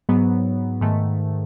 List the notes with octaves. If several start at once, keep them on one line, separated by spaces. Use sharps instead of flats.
G#2 F#3 B3
G#2 D#3 A3